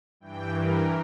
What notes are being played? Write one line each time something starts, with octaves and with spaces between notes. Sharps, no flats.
G2 E3 G5
A#4